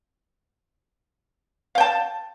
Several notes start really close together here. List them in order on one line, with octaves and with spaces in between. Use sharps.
F5 G5 A5